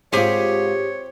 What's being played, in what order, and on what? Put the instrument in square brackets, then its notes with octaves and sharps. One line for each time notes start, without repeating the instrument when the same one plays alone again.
[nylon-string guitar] G#2 F4 [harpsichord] C4 C5 [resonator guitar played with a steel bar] G4 G#4 [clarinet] C#5